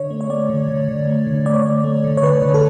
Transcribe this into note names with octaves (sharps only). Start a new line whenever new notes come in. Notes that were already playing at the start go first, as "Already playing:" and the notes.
Already playing: D3 C#5
A3
C#5
A3 D5
D3
D3
D3
A3
D3
A3 D5
C#5
A3 D5
A3
D3
C#5
D3 B4
D3
A4